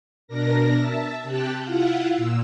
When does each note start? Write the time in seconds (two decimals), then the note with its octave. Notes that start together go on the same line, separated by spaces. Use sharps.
0.28 B2 D4 A#4 A#6
0.76 E5 A5
1.24 C3 G4 G5 A5 F#6
1.63 E4 F4 F5 F#5
2.12 A#2 E6